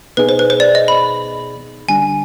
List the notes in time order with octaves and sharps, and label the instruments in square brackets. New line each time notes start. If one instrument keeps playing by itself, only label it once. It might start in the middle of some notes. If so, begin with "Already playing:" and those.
[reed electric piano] B2 B3 D#4 G#4 [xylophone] B4
[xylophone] C5
B4
C5
D5
D#5
B5
[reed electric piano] D3 G3 D4 [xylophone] G#5